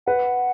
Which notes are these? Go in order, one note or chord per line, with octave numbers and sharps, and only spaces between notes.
B4 F#5